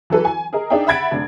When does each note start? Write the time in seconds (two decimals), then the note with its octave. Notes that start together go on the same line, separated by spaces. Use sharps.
0.10 E3 F#3 A4 B4
0.25 G#5
0.53 G#4 A#4 D#5
0.70 D4 D#4 G#4 D5 E5 G5
0.87 E5 F#5 B5 G#6 A6 D7
1.11 F1 D4